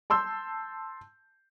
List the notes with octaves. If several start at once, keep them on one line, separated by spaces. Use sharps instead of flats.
A5 C6 E6 G6